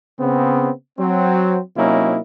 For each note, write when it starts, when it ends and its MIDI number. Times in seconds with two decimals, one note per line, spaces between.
0.18 0.70 49
0.18 0.70 59
0.18 0.70 60
0.99 1.60 54
0.99 1.60 60
1.76 2.19 48
1.76 2.19 54
1.76 2.19 58
1.76 2.19 61
1.76 2.19 63
1.76 2.19 64